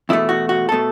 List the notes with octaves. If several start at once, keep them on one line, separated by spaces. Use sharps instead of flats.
E2 B2 A3 E4
F#4
F#4
B2 A3 A4